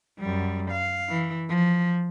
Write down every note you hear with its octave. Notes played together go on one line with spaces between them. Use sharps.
F#2 G3
F5
E3
F3